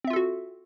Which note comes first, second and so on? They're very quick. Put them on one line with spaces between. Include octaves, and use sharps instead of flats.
C4 E5 F4 A4 F#4